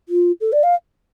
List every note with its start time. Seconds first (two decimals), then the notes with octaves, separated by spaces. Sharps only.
0.09 F4
0.41 A4
0.52 D5
0.63 F5